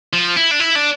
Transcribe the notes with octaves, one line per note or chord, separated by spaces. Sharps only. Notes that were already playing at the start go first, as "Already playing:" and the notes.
F3
E4
D4
E4
D4